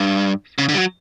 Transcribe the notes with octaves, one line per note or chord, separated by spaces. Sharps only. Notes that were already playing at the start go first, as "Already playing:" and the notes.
Already playing: G2
C#3
D3
G3
F#3